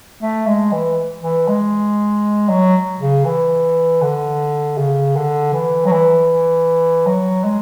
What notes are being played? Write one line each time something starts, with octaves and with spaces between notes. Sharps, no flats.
A3
G#3
E3
E3
G#3
F#3
C#3
E3
D3
C#3
D3
E3
F#3
E3
F#3
G#3